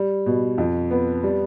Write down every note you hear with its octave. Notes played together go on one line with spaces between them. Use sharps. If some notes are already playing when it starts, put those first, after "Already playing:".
Already playing: G3
B2
F2
B3
G3